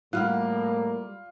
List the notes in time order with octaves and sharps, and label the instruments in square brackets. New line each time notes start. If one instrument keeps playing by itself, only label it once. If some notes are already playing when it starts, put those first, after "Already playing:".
[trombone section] A2 A#3 [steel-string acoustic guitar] G3 [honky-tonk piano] F4 [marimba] F#5 F6 F#6